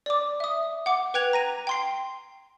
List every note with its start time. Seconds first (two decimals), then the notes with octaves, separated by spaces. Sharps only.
0.06 D5 D6
0.40 E5 D#6
0.86 F#5 D6
1.14 B4 G5 F#6 G#6 F7
1.33 A#5 A#6 D#7
1.67 G5 C6 C7